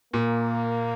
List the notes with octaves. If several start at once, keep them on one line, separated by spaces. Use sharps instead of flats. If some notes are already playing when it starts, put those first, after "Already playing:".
A#2 A#3